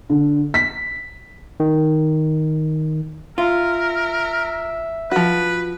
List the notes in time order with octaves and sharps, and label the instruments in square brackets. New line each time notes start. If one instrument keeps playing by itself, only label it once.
[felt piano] D3
B6
[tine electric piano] D#3
[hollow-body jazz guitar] F4 [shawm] A#4 [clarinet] E5
[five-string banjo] F3 F#4 [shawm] B4